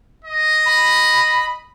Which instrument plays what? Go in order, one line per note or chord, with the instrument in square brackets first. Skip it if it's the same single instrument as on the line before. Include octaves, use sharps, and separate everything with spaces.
[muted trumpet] D#5
[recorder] B5